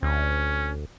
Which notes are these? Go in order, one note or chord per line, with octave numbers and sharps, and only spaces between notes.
D2 C#4